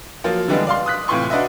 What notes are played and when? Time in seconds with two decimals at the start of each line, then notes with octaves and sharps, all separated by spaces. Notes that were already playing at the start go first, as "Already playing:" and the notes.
0.24 F3 F#3 A#3 F4
0.48 D3 E3 G3 G#3 B3 D4
0.67 D5 F5 C6
0.86 D#6 F#6 B6
1.08 A2 C3 E3 F4 C6 C#6
1.30 D4 F#4 B4 D#5 E5